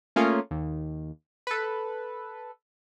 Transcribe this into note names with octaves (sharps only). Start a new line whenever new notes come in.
A3 A#3 C#4 F4 G#4
D#2
A4 B4